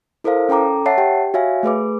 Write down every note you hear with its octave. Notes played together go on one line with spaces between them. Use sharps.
E4 A4 A#4 C5 F5
C#4 A4 G5 A#5 D6
C#5 E5 F#5 A5 C7
G4 G5
F#4 C#5 E5 F5 G#5
A3 G#4 B4 D6